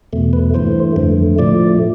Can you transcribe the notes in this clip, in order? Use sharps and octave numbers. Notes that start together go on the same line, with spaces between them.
E2 B2 A3
B4
G2 E3 A3 C5
F2 D3 A3
A2 F3 A3 D5